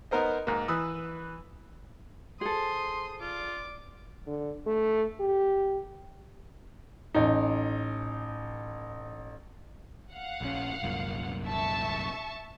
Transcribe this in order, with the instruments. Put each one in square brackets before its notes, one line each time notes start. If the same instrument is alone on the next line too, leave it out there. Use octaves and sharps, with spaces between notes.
[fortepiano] B3 D#4 A#4 C5 D#5
G#2 A#3
E3 B4 D#6 E6
[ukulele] G#4 A4 [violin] C5 D#6 [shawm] C6
[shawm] F4 [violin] D5 D6
[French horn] D3
A3
G4
[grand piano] A1 D#4
[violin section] F5 F#5
[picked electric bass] A#1 C#4
C2 F#2 A#2
[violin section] E5 A5 C#6